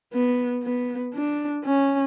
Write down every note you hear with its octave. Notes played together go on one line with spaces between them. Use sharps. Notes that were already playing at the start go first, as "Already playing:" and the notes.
B3
B3
D4
C#4